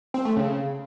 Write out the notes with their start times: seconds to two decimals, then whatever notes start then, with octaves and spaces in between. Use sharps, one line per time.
0.14 C4
0.25 A3
0.36 C#3